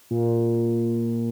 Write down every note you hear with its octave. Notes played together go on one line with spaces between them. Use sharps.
A#2